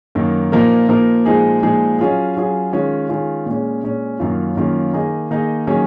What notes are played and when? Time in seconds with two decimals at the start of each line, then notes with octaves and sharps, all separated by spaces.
0.15 F#2 D#3 A#3
0.52 A#2 F3 A#3 D#4 A#4
0.89 A#2 F3 A#3 D#4 A#4
1.26 A#2 F3 G#3 D#4 G#4
1.62 A#2 F3 G#3 D#4 G#4
1.99 F#3 C#4 F4 G#4
2.36 F#3 C#4 F4 G#4
2.73 D#3 G#3 C#4 F4
3.09 D#3 G#3 C#4 F4
3.46 A#2 G#3 C#4
3.83 A#2 G#3 C#4
4.20 F#2 D#3 A#3 C#4 F4
4.57 F#2 D#3 A#3 C#4 F4
4.93 D#3 A#3 D#4 G#4 D#5
5.31 D#3 A#3 D#4 G#4 D#5
5.67 D#3 F#3 A#3 C#4 G#4